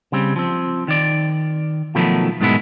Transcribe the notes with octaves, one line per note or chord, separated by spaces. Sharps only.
C#3 G3 C4
F3 C4
D#3 D5
B2 D#3 F3 F#3 A3 B3
G#2 B2 D#3 G#3 B3 E4